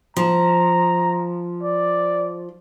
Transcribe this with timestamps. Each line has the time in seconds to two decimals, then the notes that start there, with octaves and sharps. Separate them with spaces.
0.17 F3 A#5
1.63 D5